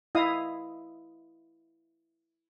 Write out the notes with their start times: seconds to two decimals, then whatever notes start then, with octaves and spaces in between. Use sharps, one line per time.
0.15 E4 D#5 F5 D#6